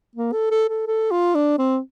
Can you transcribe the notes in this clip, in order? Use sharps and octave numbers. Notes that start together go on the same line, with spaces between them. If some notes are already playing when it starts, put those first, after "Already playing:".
A#3
A4
A4
A4
A4
F4
D4
C4